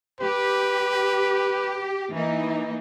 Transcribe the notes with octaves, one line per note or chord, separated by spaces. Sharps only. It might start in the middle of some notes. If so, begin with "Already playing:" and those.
G4 B4
E3 A#3 D#4